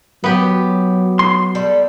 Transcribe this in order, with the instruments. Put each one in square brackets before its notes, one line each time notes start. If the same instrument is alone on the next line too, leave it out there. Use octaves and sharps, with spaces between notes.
[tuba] F#3 [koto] B3 G4
[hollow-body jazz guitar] C6
[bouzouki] G3 G#3 A4